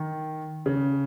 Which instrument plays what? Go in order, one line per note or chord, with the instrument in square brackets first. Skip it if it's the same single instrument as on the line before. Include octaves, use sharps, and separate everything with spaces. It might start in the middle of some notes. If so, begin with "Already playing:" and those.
Already playing: [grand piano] D#3
C#3